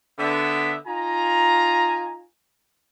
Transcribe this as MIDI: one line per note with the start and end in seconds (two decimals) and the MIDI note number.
0.19 0.76 50
0.19 0.76 59
0.19 0.76 76
0.87 2.24 63
0.87 2.24 65
0.87 2.24 80
0.87 2.24 82